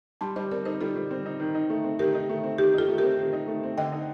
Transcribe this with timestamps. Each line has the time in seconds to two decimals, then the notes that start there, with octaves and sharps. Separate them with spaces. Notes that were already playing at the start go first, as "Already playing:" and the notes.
0.21 G3 A5 C6
0.36 G3 C5 D#5
0.51 C4 A#4 D5
0.65 D#4 A4 C5
0.81 G3 F4 A4
0.96 G3
1.11 C4
1.26 D#4
1.40 D#3
1.55 D#4
1.70 A3
1.84 C4
1.99 D#3 G4 A#4
2.14 D#4
2.29 A3
2.44 C4
2.58 D#3 G4
2.74 D#4 F4 A4
2.88 A3
2.98 C4 G4 A#4
3.19 D#3
3.33 D#4
3.48 A3
3.63 C4
3.78 D3 D#5 G5
3.92 D#4